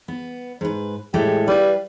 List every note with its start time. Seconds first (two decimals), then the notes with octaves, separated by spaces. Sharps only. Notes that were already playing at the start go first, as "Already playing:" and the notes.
0.08 B3
0.61 G#2 B4
1.14 A2 G#3 A3 G4
1.48 G3 B4 F5